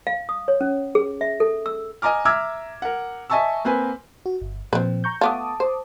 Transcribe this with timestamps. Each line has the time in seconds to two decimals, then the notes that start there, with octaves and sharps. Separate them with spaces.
0.07 F5
0.29 D#6
0.48 C#5
0.61 C#4
0.95 G#4
1.21 E5
1.40 A4
1.66 E6
2.02 D#5 G#5 A#5 D6 F6
2.25 E5 A#5 D6 E6 F6 G#6
2.82 A#4 F#5
3.30 D#5 E5 G#5 A5 C#6 E6
3.65 A#3 C4 B4 G#5
4.26 F#4
4.41 G1
4.73 A#2 F3 C4 B4
5.04 A#5 C#6 G6
5.21 A3 B3 F4 A5 D6 D#6
5.60 C5